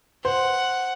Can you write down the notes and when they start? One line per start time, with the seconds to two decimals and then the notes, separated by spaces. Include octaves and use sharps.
0.25 C5 F#5